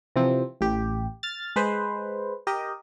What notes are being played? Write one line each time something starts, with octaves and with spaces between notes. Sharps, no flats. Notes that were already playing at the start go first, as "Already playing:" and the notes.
C3 E3 F3 C4
A1 G4
F6 A6
G#3 B4 C5
G4 A#4 D#5